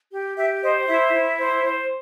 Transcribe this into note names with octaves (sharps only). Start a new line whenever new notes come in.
G4
G4 E5
C5 D#5
E4 E5
E4
C5
C5